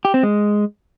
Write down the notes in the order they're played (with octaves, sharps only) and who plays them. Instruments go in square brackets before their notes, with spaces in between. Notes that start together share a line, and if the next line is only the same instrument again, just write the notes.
[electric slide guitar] G4
C4
G#3